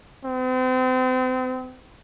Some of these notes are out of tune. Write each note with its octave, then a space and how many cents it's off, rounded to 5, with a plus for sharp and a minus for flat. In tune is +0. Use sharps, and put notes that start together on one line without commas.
C4 -35